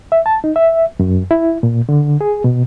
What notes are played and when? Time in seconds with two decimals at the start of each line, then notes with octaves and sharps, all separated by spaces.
0.12 E5
0.26 A5
0.44 D#4
0.56 E5
1.00 F#2
1.31 E4
1.63 A#2
1.89 D3
2.21 G#4
2.44 B2